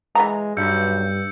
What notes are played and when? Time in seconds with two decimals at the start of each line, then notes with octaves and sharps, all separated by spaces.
0.15 E3 G#3 B3 A#5
0.57 B1 G2 E6 G6 C#7